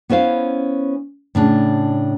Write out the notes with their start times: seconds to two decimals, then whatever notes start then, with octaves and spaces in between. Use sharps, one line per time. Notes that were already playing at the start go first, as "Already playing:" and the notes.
0.10 B3 C#4 E4 C5 F5
1.35 A2 C#3 D4